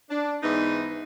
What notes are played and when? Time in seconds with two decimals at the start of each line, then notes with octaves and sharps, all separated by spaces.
0.10 D4
0.42 G#2 E3 B3 D#4